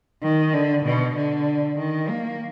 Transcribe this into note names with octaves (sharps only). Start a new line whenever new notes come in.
D#3
D3
B2
D3
D#3
A#3